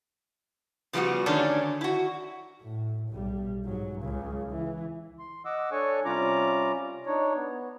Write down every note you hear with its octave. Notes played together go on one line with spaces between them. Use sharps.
C#3 F3 G3 A#3 B3 F#4
D3 D#3 A3 C#4 D4
E4 F#4
A2
B1 G3
G#2 F#3
C#2 C#3
E3
C6
D#5 F#5 D6 E6
D4 A4 C#5 G#5 C#6
C3 G3 C#4 F4 A#5 D6
D4 D#4 C#5
B3